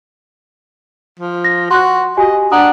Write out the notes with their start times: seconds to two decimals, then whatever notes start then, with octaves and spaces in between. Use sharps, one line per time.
1.20 F3
1.44 A#6
1.71 F#4 C6 F#6
2.17 F#4 G4 D#5 G#5
2.52 D4 F#5 A#5 D#6